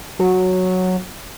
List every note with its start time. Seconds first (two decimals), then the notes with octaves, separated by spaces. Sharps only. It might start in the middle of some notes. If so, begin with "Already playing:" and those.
0.19 F#3